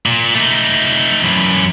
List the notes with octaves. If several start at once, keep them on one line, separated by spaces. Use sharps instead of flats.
A#2
A3 D#4
F#2 E3